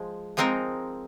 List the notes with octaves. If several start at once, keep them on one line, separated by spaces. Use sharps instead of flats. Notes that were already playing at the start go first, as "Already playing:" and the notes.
Already playing: F3 G#3
F3 G#3 C4 D#4 A#4